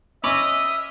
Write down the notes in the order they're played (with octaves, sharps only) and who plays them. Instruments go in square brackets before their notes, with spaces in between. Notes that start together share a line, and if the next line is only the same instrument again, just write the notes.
[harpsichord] C#4 B5 D6 [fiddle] D#5 [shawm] E5